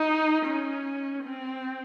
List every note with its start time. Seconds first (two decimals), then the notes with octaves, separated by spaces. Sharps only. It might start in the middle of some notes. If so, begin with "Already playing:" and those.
Already playing: D#4
0.46 C#4
1.24 C4